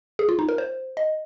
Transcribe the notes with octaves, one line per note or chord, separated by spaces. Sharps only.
G#4
F4
D#4
A#4
C5
D#5